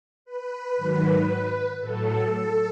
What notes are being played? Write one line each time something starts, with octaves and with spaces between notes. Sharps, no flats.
B4
G#2 D#3 F#3
A2 F#3 A4
A4